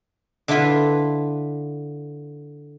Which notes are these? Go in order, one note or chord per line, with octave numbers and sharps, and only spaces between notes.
D3 D4 E4 F4 B4